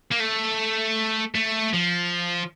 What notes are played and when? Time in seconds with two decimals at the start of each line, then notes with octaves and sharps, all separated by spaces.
0.11 A#3
0.20 A3
1.35 A3
1.74 F3